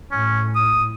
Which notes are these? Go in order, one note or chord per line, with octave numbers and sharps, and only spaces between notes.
A2 C#4
D#6